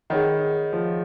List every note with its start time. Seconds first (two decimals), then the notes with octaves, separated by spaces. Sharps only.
0.10 D#3 G#4 C#5 F#5 B5
0.73 F3